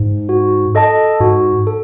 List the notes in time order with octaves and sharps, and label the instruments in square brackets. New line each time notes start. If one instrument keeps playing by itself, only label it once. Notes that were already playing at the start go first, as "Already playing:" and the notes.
Already playing: [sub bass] G#2
[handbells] F#4
A4 D#5 A5
[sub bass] G#2 [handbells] F#4
[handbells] A4